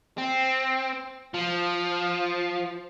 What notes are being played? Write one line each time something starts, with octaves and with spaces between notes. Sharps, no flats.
C4
F3